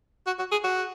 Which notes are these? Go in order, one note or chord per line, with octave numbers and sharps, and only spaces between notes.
F#4
F#4
G#4
F#4